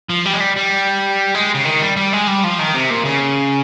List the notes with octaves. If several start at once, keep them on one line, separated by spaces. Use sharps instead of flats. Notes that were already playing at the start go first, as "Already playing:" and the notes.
F3
G3
G#3
G3
G3
G#3
C#3
D#3
G3
G3
G#3
G3
F3
D#3
C3
A#2
C#3